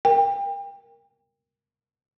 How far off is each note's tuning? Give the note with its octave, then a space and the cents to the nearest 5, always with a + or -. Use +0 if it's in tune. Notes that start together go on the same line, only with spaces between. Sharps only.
A#4 +0 G5 +30